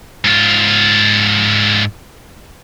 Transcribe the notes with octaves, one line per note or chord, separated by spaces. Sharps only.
G#2 F4